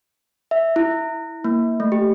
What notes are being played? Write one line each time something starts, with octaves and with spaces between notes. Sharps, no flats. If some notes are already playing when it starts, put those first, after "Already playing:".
E5
E4
A#3
A3
G4